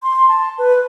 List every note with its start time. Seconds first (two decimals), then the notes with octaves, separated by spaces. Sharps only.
0.03 C6
0.28 A5
0.58 B4